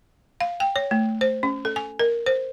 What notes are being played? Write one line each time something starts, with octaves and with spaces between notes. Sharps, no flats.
F5
G5
C#5
A3
C5
C#4
A4
G#5
A#4
C5